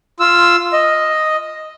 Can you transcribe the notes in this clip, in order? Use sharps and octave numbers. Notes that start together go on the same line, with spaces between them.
F4 E6
D#5